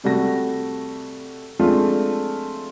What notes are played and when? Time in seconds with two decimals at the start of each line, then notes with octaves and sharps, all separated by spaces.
0.04 C3 G3 A3 F#4 A#6
1.59 F3 G#3 A3 C4 D4 F4